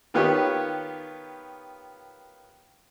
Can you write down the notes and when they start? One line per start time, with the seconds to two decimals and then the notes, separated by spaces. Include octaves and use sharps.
0.14 D#3 B3 F4 G4 B4 C#5